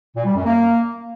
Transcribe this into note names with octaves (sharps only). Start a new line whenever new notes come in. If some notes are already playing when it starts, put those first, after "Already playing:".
A#2
G3
F#2
A#3